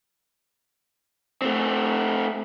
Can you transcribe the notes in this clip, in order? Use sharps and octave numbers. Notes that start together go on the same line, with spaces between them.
A3 C4